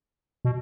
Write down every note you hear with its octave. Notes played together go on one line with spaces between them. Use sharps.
B2